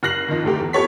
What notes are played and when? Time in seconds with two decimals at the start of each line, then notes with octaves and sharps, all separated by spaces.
0.03 F#1 F6 F#6 A#6 C7 F#7
0.28 F2 D#3
0.43 F1 D2 A3 G4
0.61 E2
0.73 F2 B3 G4 A4 C#5 B6